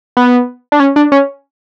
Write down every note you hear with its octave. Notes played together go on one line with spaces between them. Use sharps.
B3
D4
C#4
D4
C#4